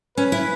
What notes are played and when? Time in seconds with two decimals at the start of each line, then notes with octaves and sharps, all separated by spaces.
0.17 C#4 B4
0.32 E4